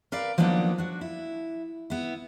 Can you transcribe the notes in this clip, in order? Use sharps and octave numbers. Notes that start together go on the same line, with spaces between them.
A#4 B4 D5 F5
F3 F#3 A#3 B3 D4 D#4
D4 F#4
E4
B3 E4